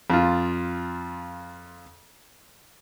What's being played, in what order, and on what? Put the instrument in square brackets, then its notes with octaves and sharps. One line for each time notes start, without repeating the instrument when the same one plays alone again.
[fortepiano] F2 F4